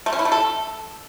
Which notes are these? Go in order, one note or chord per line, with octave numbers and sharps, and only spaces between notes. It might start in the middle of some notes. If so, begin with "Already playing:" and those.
A3
C#4
E4
A3
A4